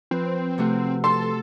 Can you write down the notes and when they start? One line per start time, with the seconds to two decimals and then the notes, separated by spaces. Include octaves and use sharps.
0.11 F3 C4 B4
0.58 C3 A3 F#4
1.04 A4 C6